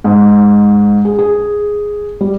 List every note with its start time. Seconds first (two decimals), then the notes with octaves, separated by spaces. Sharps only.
0.04 G#2
1.05 G#4
1.19 G#4
2.21 G3